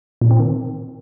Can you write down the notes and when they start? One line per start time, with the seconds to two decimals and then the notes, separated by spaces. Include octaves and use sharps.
0.21 A#2
0.31 C4
0.40 D#3